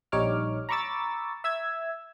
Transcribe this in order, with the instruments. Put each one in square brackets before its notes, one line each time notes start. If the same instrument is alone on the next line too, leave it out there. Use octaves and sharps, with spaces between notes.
[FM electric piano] A#1 G3 D#4 C#5 D6 F6
A#5 B5 C#6 D6 E6 A6
E5 E6 G#6